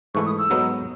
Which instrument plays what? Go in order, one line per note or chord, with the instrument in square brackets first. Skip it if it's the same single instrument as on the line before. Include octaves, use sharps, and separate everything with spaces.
[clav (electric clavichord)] G#2 E3 A3 E4 [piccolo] C#6
[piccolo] D#6
E6
[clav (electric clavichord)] G#2 F#3 B3 D#4